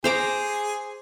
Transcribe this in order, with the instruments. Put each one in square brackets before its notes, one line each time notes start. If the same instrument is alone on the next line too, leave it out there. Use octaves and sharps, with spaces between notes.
[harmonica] G#4 [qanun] C5 A#5 D6